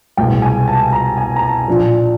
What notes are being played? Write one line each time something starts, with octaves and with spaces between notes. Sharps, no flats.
C2 B2 G#3 G5
G#5
A5
A#5
G#5
A#5
A5
A#2 F3 A#3 D4